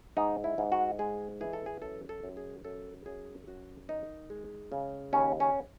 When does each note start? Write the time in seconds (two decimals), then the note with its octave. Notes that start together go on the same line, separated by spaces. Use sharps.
0.17 G#2 D#4
0.44 E4
0.58 G#2
0.72 F#4
0.99 G#3 G#4
1.41 E3 G#4
1.53 A4
1.66 G#4
1.82 F#2 A4
2.09 A4
2.23 F#2
2.37 G#4
2.65 F#2 A4
3.06 F#2 G#4
3.47 F#2 F#4
3.89 D#3 D#4
4.30 G#3
4.72 C#3
5.13 D#2 C#4
5.40 C#4